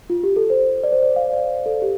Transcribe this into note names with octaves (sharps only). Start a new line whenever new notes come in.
F4
G4
A4
C5
D5
C5
D5
F5
D5
A4
G4